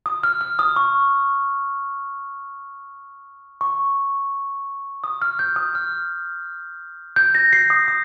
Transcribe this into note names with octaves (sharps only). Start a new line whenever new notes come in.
D#6
F6
F6
D#6
C#6
C#6
D#6
F6
G6
D#6
F6
G6
A#6
C7
D#6
D#6